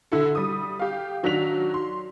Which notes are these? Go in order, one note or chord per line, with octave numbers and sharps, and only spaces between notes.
D3 E4 A4
G3 D#6
G4 F5
D#3 F#3 D4 F#4 B6 F7
C6